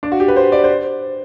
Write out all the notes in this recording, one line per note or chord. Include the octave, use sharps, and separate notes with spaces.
D4
F#4
G4
B4
C5
D5
C5